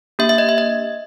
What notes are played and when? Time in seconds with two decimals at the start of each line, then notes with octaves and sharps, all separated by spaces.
0.19 A#3 D4 G4 E5
0.29 E5
0.38 D#5
0.49 E5
0.58 D#5